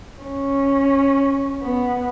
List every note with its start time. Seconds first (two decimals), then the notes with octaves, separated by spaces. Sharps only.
0.24 C#4
1.62 B3